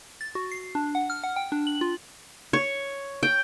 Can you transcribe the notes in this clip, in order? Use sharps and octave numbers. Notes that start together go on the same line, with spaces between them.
A6
F#4
C7
D4
F#5
F6
F#5
G5
D4
F#7
F4
C#5
G5